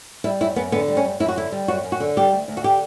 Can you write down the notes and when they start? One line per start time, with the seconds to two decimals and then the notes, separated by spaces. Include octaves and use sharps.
0.24 G3 E4
0.41 F#2 E4
0.56 F#2 B3
0.72 D3 B3
0.88 G3
0.97 C#4
1.04 F#2
1.20 F#2 E4
1.28 F#4
1.36 D3 E4
1.52 G3
1.68 F#2 F#4
1.84 F#2
1.92 F#4
2.00 D3
2.17 G3 G4
2.32 D2
2.48 D2
2.57 F#4
2.64 D3 G4